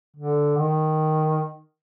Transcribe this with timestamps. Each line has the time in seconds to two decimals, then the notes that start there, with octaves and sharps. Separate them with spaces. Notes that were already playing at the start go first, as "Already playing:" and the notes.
0.17 D3
0.57 D#3